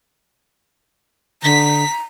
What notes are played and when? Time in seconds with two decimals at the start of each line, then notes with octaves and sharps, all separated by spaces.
1.43 D3 A#5 B6